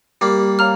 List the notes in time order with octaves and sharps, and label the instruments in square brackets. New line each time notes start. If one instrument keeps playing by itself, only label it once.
[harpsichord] G3 A#3 [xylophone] G4
[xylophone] C#5 F5 A#5 F6